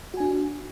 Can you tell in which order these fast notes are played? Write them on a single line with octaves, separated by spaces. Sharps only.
F#4 G#5 D4